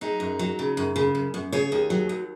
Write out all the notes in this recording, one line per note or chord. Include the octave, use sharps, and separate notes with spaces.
F#3 D#4 G#4
F#2
F#3
C#3
F#2
C#3
F#2
F#2
C#3 G#4 C#5
D#2
F#3
D#2